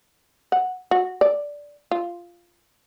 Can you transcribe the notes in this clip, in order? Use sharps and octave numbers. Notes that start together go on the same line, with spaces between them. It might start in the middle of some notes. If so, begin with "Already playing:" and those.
F#5
F#4
D5
F4